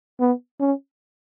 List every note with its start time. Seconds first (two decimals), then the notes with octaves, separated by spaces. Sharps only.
0.20 B3
0.60 C#4